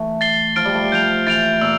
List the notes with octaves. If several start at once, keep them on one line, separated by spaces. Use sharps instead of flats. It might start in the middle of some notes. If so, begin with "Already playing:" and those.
Already playing: E3 A3
A6 C7 G7
F3 F6 A6 D7
G3
A3
G3
F3 G6 D7 F7
E3 A6 D7 F7
A#2 E6